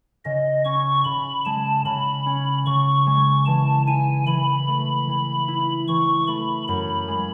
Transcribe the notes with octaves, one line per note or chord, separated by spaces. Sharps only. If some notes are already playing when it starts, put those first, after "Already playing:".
C#3 D#5
C#4 C#6
C#3 B5
G#3 A5
C#3 B5
C#4
C#3 C#6
G#3
E3 A5
E4 G#5
E3 B5
A3
E3
E4
E3 C#6
A3 B5
F#2 B5
G#3